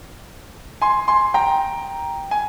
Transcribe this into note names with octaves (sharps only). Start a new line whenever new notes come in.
G#5 C6
G#5 C6
G5 A#5
G#5